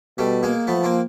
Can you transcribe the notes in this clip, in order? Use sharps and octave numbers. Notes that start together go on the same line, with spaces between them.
B2 G3 A3
G#3 A#3
F3 A3 B3
A#3 C4